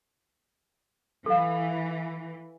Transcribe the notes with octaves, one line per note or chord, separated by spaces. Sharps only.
E3 A4 F5